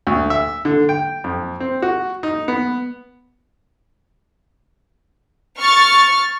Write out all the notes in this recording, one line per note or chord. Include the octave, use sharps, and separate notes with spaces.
D2
E5
D3
G5
F2
C4
F#4
D#4
B3
C#6 F6 A6